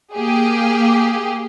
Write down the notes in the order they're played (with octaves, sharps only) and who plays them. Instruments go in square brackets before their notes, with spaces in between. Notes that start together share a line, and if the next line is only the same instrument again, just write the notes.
[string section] A#3 G4 G#4